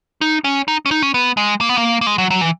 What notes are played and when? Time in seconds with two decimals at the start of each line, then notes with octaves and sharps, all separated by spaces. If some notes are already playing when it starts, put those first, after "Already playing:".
0.21 D#4
0.44 C#4
0.68 D#4
0.86 C#4
0.91 D#4
1.02 C#4
1.14 B3
1.37 G#3
1.61 A#3
1.69 B3
1.78 A#3
2.01 A#3
2.07 G#3
2.18 F#3
2.30 F#3
2.41 E3